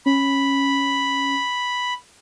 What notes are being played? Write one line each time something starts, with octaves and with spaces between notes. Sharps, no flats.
C#4 B5